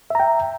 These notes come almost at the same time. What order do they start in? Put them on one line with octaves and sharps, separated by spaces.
E5 A#5 G5